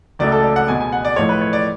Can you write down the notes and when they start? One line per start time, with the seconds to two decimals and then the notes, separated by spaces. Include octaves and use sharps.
0.19 C#2 C#3 F#3 A3 D5
0.32 A4
0.44 D5
0.56 F#5
0.68 C#2 B2 G#3 G#5
0.80 G#5
0.92 F#5
1.05 D5
1.16 A2 F3 G#3 C#5
1.29 B4
1.41 C#5
1.53 D5